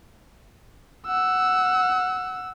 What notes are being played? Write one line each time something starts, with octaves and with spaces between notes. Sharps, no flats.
F#5 E6